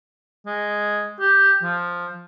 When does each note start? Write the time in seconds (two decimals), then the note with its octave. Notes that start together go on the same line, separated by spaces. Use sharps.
0.47 G#3
1.20 G4
1.62 F3